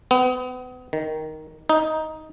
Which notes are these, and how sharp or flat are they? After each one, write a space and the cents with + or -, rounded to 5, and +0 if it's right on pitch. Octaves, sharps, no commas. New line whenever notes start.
B3 +35
D#3 +5
D#4 +10